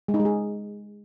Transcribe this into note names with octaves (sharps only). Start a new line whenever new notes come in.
G#3
D#4
G#3
G#4